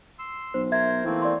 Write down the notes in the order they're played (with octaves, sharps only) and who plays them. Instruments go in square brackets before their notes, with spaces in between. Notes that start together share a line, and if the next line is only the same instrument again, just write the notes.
[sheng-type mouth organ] C6 E6
[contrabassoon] B1 [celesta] C5
[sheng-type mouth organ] A#4 C5 [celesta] E5 G#6
[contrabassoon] E3 [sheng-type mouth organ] A3 A#3 C4
[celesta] D5 C6